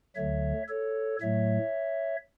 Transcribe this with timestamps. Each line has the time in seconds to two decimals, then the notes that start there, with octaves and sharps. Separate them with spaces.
0.15 D2 D3 F#3 C#5 E5
0.69 A4 C#5
1.21 A2 F#3 A3 C#5 E5